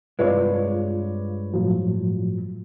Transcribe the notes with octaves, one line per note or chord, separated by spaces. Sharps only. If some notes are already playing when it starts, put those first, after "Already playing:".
G2 C3 G#3 F4 B4 C#5 D5
A2 F3 F#3